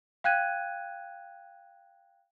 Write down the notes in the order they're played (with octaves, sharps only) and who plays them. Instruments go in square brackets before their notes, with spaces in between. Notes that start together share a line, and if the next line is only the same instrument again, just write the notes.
[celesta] F5 G5 F#6 G#6 D#7